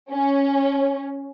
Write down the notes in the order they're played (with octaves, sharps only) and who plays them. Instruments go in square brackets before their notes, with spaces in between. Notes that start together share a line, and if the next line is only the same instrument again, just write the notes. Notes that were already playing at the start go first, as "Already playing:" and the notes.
[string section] C#4